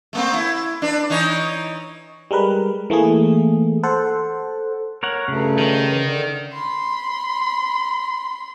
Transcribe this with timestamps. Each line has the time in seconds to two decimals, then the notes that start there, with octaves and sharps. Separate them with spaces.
0.13 A3 A#3 C4
0.34 E4
0.82 D4 B4
1.10 E3 D#4 C#5
2.31 G3 G#3 A#4 B4
2.90 E3 A3 A#3 G#4
3.83 A4 C5 F#5
5.03 A#4 C#5 F#5
5.28 G2 C#3 F#3 A3
5.58 D#3
5.88 E3
6.03 D3
6.53 B5 C6